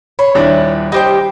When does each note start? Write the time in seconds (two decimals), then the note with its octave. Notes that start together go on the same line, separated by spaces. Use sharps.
0.19 C#5 B5
0.35 D#1 D4 E4
0.92 G3 G4 C5 D#5 G5